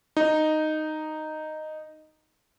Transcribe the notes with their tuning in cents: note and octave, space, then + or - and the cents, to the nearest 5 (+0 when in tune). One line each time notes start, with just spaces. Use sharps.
D#4 -5